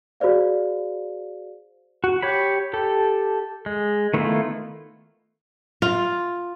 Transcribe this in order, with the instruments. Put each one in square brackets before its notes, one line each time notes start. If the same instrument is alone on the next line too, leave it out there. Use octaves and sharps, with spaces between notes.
[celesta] F#4 G#4 C5 D5 F5
[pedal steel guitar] F#4
G4 C#5 B5
G4 A4
G#3
D#3 A3 B3 E4 F4
[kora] F4